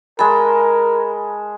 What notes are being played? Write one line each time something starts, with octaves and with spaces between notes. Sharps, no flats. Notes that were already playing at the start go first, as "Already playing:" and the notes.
G#3 A#4 A5 B5